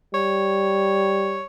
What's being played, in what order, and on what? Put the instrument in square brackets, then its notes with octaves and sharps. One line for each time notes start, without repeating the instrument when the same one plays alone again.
[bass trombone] G3 [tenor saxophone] C#5